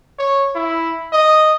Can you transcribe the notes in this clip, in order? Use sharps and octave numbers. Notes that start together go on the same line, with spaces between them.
C#5
E4
D#5